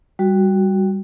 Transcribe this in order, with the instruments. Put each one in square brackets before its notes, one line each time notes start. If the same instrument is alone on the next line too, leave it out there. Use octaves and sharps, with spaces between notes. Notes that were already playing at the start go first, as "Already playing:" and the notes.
[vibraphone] G3 F#4